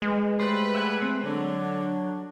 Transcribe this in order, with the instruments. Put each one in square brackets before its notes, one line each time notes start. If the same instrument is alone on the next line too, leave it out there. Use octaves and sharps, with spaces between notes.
[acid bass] G#3 [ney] B4
[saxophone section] G3 B4 [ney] A3 [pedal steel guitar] C5
[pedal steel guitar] E5 F#5 G#5
[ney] A3 [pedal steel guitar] C4
[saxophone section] D3 [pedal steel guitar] F#3 [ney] D4